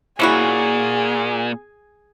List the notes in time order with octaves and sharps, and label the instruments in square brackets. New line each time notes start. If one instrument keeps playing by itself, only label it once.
[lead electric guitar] A#2 [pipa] C#4 E4 F#4 [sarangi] G#4